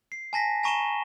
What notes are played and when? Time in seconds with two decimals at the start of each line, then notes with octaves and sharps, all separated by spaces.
0.12 C7
0.33 G#5 A5 A#6 B6
0.63 G#5 A#5 C#6 D#7 E7 G7